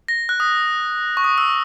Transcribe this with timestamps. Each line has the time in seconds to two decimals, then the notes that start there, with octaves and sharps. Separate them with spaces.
0.08 A#6
0.29 F#6
0.40 D#6
1.17 C#6
1.24 D#6
1.38 E6